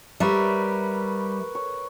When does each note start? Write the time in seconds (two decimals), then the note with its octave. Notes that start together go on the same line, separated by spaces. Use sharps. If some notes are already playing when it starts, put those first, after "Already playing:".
0.20 G3 A#4 B4 C#5 E5
1.55 C#5